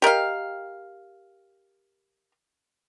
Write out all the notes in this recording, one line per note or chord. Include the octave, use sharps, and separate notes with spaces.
G4 A#4 D#5 F5